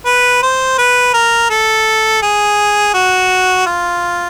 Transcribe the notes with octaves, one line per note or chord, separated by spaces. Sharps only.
B4
C5
B4
A#4
A4
G#4
F#4
F4